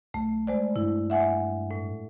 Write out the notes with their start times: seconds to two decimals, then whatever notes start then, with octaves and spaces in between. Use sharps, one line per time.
0.14 B1 A3
0.47 G#3 C5 D5
0.76 G2 E4
1.10 E5 F#5 G#5
1.71 A2